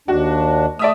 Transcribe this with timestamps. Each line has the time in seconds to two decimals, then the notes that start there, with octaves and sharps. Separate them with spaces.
0.08 D#2 D4 F#4
0.79 A3 D5 E5 D#6